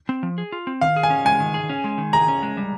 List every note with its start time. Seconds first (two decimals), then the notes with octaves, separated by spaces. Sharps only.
0.09 C4
0.23 F3
0.38 G#4
0.52 F4
0.67 C4
0.81 D#3 F5
0.96 G#4
1.03 G#5
1.10 C#4
1.25 G#3 G#5
1.40 D#3
1.54 G#4
1.69 C#4
1.84 G#3
1.98 D#3
2.13 G#4 A#5
2.28 C#4
2.43 G#3
2.57 G3